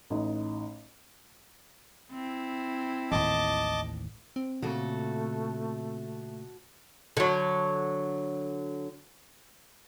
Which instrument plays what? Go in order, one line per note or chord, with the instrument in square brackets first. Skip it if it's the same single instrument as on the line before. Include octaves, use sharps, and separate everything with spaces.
[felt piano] A1 D#4
[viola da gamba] C4 E4
[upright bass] A1 D#2 [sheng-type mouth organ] D#5 A5 D6
[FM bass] C4
[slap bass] A#2 C#3 [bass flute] A3 [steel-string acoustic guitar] F#4 A4
[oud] D3 F#3